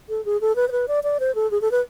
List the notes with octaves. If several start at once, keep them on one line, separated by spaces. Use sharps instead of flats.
A4
G#4
A4
B4
C5
B4
D5
D5
C5
A4
G#4
A4
B4